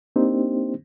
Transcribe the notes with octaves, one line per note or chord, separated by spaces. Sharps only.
A#3 C4 D4 D#4 G4 C5